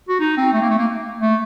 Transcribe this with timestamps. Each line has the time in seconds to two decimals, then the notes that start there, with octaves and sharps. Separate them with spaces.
0.09 F#4
0.20 D#4
0.37 C4
0.53 A3
0.61 A#3
0.70 A3
0.78 A#3
1.21 A3